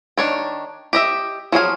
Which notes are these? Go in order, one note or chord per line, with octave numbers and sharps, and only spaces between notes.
D#3 D4 C#5 G5
G4 D#5 E5
F3 F#3 G#4 F5